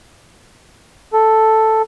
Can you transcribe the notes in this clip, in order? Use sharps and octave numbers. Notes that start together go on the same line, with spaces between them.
A4